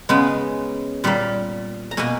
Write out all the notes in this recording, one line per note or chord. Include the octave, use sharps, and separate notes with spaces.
C#3 G#3 B3
A#2 G3 A#3
A#5
B2 A#3 G#5